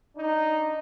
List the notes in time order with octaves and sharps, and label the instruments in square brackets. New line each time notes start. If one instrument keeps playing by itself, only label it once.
[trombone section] D4 D#4